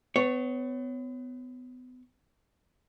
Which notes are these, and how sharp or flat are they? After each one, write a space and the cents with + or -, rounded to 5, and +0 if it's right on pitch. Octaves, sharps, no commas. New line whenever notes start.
B3 +35 C#5 +0